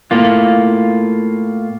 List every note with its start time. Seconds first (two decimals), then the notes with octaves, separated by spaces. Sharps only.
0.11 A2 A#3 F4